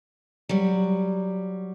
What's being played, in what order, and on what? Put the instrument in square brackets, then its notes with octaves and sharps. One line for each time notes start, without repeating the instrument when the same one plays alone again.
[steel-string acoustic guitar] F#3 G3